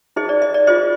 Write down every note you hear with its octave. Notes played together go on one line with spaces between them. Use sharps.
D#4 G#4 C5 D#5
D5
D#5
D5
F4 G#4 C5 D#5